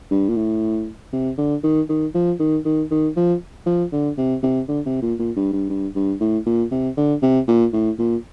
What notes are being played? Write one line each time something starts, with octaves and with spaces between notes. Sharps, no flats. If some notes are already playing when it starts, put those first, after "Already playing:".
G2
A#2
A2
C3
D3
D#3
D#3
F3
D#3
D#3
D#3
F3
F3
D3
C3
C3
D3
C3
A#2
A#2
G2
G2
G2
G2
A2
A#2
C3
D3
C3
A#2
A2
A#2